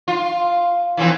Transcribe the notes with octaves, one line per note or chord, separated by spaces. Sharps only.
F4
E3 F3 C4